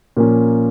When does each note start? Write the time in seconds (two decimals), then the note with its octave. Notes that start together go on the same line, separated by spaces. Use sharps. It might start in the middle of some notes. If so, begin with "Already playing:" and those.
0.17 A#2 F3 A#3 C#4